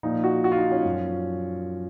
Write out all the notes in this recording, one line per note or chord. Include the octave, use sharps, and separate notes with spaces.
A#2 F3 D#4
F#4
F#4
F4
D#4
C#4
F#2 F3